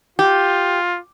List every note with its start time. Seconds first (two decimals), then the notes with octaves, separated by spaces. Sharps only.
0.19 F4 G4